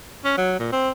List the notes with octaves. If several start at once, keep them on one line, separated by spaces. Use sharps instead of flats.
C#4
F#3
A#2
C4